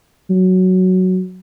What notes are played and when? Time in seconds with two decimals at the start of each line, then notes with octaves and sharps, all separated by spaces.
0.30 F#3